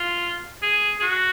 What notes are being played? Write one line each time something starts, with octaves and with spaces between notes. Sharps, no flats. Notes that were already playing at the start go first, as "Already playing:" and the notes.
Already playing: F4
G#4
G#4
F#4